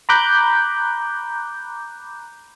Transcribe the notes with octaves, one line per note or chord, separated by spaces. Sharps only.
A#5 B5 D6 F#6 G6